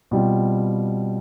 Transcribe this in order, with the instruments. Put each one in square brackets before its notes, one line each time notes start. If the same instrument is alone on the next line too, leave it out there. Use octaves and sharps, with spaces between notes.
[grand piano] B2 G3 C4 F4